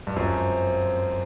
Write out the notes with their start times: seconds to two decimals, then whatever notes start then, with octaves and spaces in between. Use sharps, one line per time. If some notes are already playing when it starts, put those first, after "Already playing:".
0.07 G2
0.16 F#2 F3 G#3 C4 F4